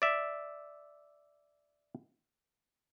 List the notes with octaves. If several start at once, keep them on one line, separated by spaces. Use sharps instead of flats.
D5 E5